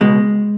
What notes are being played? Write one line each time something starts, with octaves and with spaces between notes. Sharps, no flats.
C#2 B2 G#3